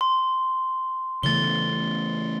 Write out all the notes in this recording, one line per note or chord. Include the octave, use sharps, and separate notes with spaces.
C6
C#3 E3 A3 A6 G7